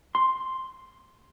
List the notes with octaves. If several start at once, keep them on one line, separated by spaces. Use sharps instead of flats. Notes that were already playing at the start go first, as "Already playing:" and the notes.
C6